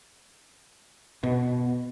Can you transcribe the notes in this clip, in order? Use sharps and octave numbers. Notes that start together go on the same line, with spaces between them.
B2